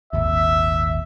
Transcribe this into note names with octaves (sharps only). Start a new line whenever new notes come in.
D#1 G#1 D#2 E5